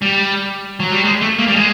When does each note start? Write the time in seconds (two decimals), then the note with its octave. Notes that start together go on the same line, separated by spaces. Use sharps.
0.02 G3
0.80 F#3
0.92 G3
1.05 G#3
1.21 A3
1.38 A#3
1.48 G3
1.56 G#3